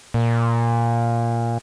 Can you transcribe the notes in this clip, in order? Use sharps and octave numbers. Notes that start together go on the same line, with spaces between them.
A#2